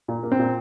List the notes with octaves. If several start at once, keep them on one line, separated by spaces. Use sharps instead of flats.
A#2
A#3
C4
A#2